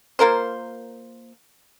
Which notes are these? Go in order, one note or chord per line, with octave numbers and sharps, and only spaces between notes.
A#3 F4 A#4 C5